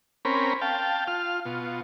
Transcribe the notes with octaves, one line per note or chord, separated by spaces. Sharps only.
C4 C#4 A#4 B5
F5 G5 A5
F4 F6
B2 F4